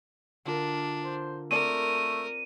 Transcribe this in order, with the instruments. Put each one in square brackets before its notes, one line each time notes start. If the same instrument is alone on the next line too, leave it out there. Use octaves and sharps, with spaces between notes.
[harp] D3 F4 A#4 [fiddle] D4
[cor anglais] C5
[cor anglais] A3 [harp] C4 D5 [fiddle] A#4 [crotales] D#7